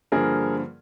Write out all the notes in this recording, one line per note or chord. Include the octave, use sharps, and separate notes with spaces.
G2 D3 F3 A#3 G#4 A#4